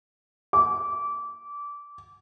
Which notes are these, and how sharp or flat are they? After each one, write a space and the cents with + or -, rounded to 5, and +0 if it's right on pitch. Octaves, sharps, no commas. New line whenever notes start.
D6 -20